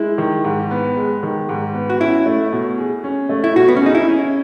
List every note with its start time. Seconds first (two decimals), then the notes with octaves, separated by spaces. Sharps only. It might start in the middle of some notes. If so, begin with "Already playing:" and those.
Already playing: G#3 E4
0.18 D#3
0.45 G#2
0.71 B3
0.97 G#3
1.23 D#3
1.49 G#2
1.74 B3
1.90 F#4
2.00 C#4 E4
2.26 A3
2.53 B2
2.78 G#4
3.04 C#4
3.29 A3
3.44 E4
3.56 B2 F#4
3.68 B3
3.77 C#4
3.82 D#4 G#4
3.95 E4
4.08 C#4